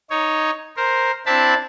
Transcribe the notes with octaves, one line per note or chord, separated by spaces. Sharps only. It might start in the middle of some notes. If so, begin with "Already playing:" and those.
D#4 C#5
A#4 C5
C4 D4 E4 A5 B5